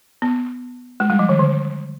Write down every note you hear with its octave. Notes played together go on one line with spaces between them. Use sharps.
B3
G#3
G3
F3
D#3
D3